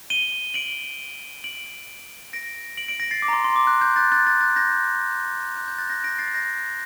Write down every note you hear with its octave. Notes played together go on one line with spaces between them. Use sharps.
D#7 G7
D7 F#7
D7 F#7
A#6 D7
D7 F#7
D7 F#7
A#6 D7
A6 C7
D6
A#5
C6
C6
D6
F#6
G6
F#6 A6
F#6 A6
F#6 A6
F#6 A6
G6 A#6
F#6
G6
F#6 A6
G6 A#6
A#6 D7
A6 C7
G6 A#6